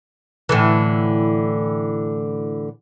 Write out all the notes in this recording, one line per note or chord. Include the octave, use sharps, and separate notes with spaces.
A2 D3 E3